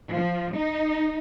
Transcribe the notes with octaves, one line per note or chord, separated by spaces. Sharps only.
F3
D#4